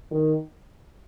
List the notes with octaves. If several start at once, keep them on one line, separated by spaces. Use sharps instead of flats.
D#3